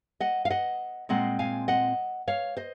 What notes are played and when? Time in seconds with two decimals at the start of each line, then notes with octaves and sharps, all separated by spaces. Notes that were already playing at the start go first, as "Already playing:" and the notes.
0.20 D#5 F#5
0.45 F5
0.50 D#5 F#5
1.09 A#2 G#3 C4 D#5 F#5
1.39 F5 G#5
1.68 D#5 F#5
2.28 C#5 F5
2.57 C5 D#5